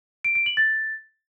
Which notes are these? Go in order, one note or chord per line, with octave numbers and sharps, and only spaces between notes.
D7
D7
F#7
A6